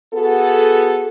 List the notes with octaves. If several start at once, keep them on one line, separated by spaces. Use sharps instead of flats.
B3 F#4 G#4 A4